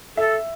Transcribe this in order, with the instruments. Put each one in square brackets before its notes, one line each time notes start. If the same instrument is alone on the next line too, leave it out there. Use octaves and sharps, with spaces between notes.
[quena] A4 [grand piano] E5